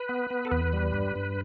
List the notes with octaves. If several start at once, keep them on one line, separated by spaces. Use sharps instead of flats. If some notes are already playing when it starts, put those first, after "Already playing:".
Already playing: B4
B3
B3
A4
E2 B4
G3
G2
G2